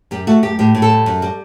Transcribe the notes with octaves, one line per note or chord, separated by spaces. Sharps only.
F#2 G4
A3 F#4
F#2 G4
A2 G4
A2
A4
G3
F#2
G3